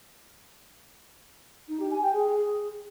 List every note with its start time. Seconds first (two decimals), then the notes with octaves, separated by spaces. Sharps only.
1.69 D#4
1.80 G4
1.91 G#5
2.02 G5
2.13 G#4